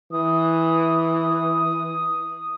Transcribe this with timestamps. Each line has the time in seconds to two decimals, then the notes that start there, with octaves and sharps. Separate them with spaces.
0.12 E3 D#6